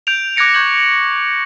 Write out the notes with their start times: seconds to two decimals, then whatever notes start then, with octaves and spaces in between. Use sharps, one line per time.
0.07 G6 D7 F7
0.36 D6 F#6 G#6 A#6 C#7 D7
0.54 C#6 G6 G#6 F#7